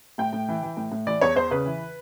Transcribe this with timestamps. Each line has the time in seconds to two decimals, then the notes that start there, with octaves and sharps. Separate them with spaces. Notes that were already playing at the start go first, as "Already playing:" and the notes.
0.18 A2 G5
0.33 A2
0.48 E3
0.63 E3
0.77 A2
0.92 A2
1.07 E3 D5
1.21 E2 C#5
1.36 E2 C5
1.51 C#3 B4
1.66 E3